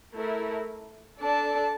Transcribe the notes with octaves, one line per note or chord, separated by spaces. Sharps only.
A3 E4 A#4
D4 A4 D5 A5